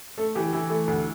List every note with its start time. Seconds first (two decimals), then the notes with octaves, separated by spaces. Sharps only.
0.17 A3 A4
0.35 E3 G4
0.53 E3 E4
0.70 A3
0.88 D2